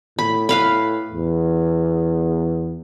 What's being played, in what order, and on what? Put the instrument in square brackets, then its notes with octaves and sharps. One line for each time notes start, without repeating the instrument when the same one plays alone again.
[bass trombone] A2 [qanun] B5
[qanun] B4 F5 B5
[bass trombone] E2